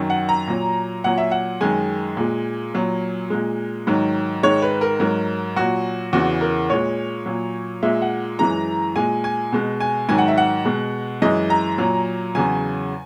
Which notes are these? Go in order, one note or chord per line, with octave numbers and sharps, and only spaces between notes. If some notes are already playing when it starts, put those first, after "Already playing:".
Already playing: F#2 D#3 F#3
F#5
A#5
A#2 F#3
A#2 F#3 F#5
E5
F#5
F#2 D#3 G#3 G#5
A#2 G#3
A#2 F#3
A#2 G#3
G#2 D#3 F#3
G#2 D#3 G#3 C#5
B4
A#4
G#2 F#3 A#4
A#2 F#3 F#4
E2 C#3 E3 F#4
A#4
A#2 G#3 C#5
A#2 F#3
A#2 G#3 E5
F#5
F#2 E3 G#3 A#5
A#2 G#3 G#5
G#5
B2 G#3
G#5
G#2 D#3 F#3 G#5
F#5
E5
F#5
B2 G#3
F#2 E3 G#3 D#5
A#5
A#2 F#3
E2 C#3 F#3 G#5